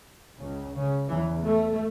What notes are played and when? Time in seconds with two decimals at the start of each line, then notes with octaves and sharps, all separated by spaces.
0.39 C#2 C#3
0.74 C#3
1.08 E2 C#3 E3
1.43 A3